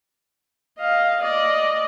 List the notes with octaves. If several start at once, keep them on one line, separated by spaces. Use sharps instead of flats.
D#5 F5
D5 D#5